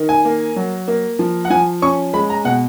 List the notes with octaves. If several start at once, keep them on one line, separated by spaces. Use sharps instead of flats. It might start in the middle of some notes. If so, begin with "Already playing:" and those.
Already playing: D#3
G#5
A#3
F#3
A#3
F3
F#5
F3 G#5
C#4 C#6
G#3 B5
A#5
B2 F#5